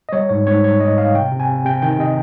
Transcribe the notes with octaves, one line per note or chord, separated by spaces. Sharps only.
D#5
G3 C#5
G#2 C#5
G#2 C#5
G3 C#5
G#2 D#5
G#2 F5
C3 G5
C3
G#5
C3
C3 G5
D#3 G5
C3 D#5